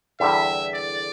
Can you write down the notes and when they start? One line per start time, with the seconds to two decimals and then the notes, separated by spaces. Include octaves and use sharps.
0.20 E2 D3 G3 E5
0.74 D5